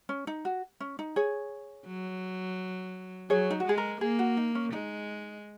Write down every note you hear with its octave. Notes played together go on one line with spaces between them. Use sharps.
C#4
D#4
F#4
C#4
D#4
G#4 C#5
F#3
F#3 G#4 C#5
D#4
F#4
G#3 G#4
A#4
A#3 G#4
F#4
D#4
C#4
G#3 D#4